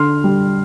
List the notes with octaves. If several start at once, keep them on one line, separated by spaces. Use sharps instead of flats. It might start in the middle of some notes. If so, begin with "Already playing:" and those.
Already playing: D3 C6 F6
G3